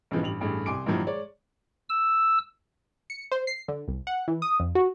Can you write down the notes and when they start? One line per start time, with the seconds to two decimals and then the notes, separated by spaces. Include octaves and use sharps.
0.11 B1 G2 C#3 E3 F3 G#3
0.22 A1 G2 F7 F#7
0.40 A1 G2 A3 G#4
0.66 C2 G#5 C6 D6 D7
0.86 G2 A#2 D#3 F3 F#3 E4
1.07 G#3 C#5 D5
1.89 E6
3.10 C#7
3.32 C5
3.47 C7
3.68 D3
3.88 C2
4.07 F#5
4.28 E3
4.42 D#6
4.60 F2
4.75 F#4